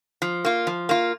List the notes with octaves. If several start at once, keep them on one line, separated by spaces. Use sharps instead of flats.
F3
A#3 F4
F3
A#3 F4